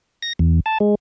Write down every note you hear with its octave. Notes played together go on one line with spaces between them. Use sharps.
A#6
E2
A5
G#3